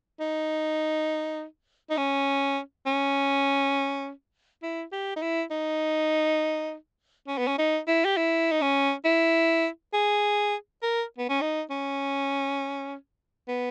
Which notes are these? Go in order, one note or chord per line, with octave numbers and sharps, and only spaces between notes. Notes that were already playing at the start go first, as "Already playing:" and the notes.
D#4
D#4
C#4
C#4
E4
G4
D#4
E4
D#4
C#4
B3
C#4
D#4
E4
G4
E4
D#4
C#4
E4
G#4
A#4
B3
C#4
D#4
C#4
B3